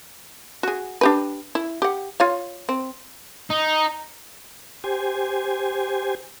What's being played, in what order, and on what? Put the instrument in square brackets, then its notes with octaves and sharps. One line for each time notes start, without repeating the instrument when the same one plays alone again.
[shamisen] F#4 G#4
D4 G4 B4
E4
G4 F#5
F4 C#5 F5
C4
[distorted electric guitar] D#4
[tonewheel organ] G4 C5 G#5